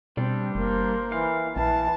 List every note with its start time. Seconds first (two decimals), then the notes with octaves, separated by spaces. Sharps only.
0.17 B2 G3 C4 D4
0.55 F#1 A#3 C5
1.12 E3 F5
1.56 A#1 E3 A5